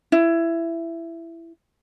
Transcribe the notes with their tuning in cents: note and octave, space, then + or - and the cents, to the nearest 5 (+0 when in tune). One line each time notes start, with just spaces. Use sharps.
E4 +15